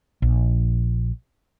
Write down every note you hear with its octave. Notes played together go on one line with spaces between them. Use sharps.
A#1